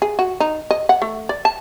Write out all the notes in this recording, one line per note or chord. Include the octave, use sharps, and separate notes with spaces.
G#4
F#4
D#4
D#5
F#5
A3
D5
A5